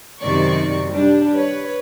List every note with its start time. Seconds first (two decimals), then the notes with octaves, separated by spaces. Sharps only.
0.20 F#2 C3 D#3 D5 C#6
0.89 G3 D4
1.35 B4 C#5